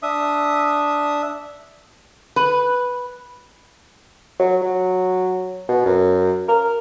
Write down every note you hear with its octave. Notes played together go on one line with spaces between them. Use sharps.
D4 E5 D#6
B4
F#3
F#3
B2
F#2
A#4